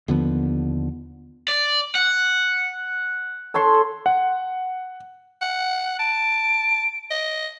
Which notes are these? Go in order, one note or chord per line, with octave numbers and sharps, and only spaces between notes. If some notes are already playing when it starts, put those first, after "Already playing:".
D#2 D3 F3 B3
D5
F#5
A4 C#5 C6
F#5
F#5
A5 D7
D#5